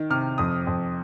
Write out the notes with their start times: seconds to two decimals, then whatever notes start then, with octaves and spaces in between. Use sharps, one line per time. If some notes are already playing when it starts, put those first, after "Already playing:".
Already playing: D#3
0.10 C3 F6
0.38 F2 D#6
0.67 F2